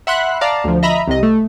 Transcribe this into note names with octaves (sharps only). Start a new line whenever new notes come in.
E5 F#5 B5 C6 F#6
D5 F5 A5 A#5
D2 F3
D#5 E5 A#5 B5
C2 C3 D#5
A3